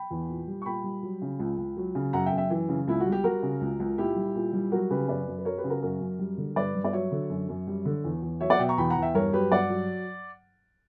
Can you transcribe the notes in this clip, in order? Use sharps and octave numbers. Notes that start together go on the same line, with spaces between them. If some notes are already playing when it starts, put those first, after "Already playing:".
Already playing: G5 B5
E2
A#2
G3
C#6
A#2 G5 B5
G3
F#3
C#3
C#2
C#2
F#3
C#3
F#2 F#5 A#5
E5 G5
F#2
E5 G5
E3
C#3
C#2 E4
F#4
G3
G4
G3 F#4 A#4
C#3
C#2
C#2
A#2 E4 G4
G3
A#2
G3
F#3 F#4 A#4
C#3 G4 B4
F#2 B4 D5
F#2
B4
F#3 A#4 C#5
G4 B4
C#3
F#4 A#4
F#2 F#4 A#4
F#2
G3
D3
G2 B4 D5
G2
D5
F#3 C#5 E5
D3
F#2
F#2
G3
D3
E2
E2
F#3 C#5 E5
D5 F#5
B2 E5 G5
A#5 C#6
E2 G5 B5
F#5 A#5
E2
E5 G5
G2 A#4 C#5
F#3 G4 B4
G2 D5 F#5
F#3